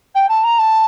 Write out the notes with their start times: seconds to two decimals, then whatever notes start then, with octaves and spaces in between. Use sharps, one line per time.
0.14 G5
0.28 A5
0.43 A#5
0.58 A5